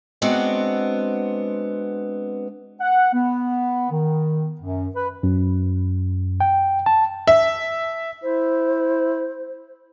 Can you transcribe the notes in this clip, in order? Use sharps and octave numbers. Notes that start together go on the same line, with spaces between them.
G#3 B3 C4 D4 F#4
F#5
B3
D#3
F#2
B4
F#2
G5
A5
E5
E4 C5